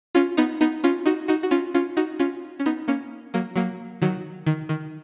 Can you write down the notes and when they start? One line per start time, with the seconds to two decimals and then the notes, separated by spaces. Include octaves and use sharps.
0.15 C#4 F4
0.37 B3 D#4
0.61 B3 D#4
0.84 C#4 F4
1.06 D#4 F#4
1.28 D#4 F#4
1.43 F#4
1.51 C#4 F4
1.74 C#4 F4
1.97 D#4 F#4
2.19 C#4 F4
2.59 C#4
2.66 B3 D#4
2.88 A#3 C#4
3.34 F#3 A#3
3.56 F#3 A#3
4.02 D#3 F#3
4.46 D#3
4.69 D#3